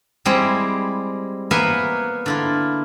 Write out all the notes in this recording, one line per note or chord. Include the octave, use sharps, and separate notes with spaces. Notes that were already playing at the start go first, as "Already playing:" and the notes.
G3 G#3 C4 E4 G#4
A#3 B3 A#4 B4 E5 G#5
D3 E4 F4